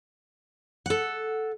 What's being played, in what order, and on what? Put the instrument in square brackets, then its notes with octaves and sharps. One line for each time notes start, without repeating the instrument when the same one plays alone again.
[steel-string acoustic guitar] A4 F#5